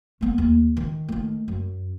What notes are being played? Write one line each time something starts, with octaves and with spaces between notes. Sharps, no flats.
A3 B3
D#2
D#3
D#3 A3
F#2